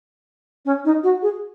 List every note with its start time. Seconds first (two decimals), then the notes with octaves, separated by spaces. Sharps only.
0.65 C#4
0.85 D#4
1.03 F#4
1.22 G#4